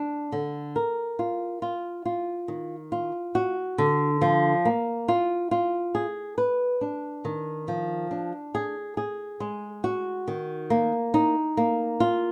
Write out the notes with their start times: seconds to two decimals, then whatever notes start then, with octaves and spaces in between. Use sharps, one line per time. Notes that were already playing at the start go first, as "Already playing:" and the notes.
Already playing: D4
0.32 D3
0.76 A#4
1.19 F4
1.62 F4
2.05 F4
2.48 D#3
2.92 F4
3.35 F#4
3.78 D3
4.22 F3
4.65 A#3
5.08 F4
5.51 F4
5.95 G#4
6.38 B4
6.81 D4
7.25 D#3
7.68 F3
8.11 D4
8.55 G#4
8.97 G#4
9.40 G#3
9.84 F#4
10.28 D#3
10.70 A#3
11.14 D#4
11.57 A#3
12.00 F4